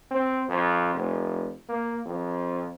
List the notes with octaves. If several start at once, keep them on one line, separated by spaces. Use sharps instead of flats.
C4
F2
F1
A#3
F2